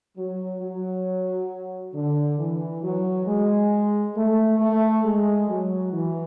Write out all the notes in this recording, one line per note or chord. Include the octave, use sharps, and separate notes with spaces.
F#3
F#3
D3
E3
F#3
G#3
A3
A3
G#3
F#3
E3